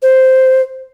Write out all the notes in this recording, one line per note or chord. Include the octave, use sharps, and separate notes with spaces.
C5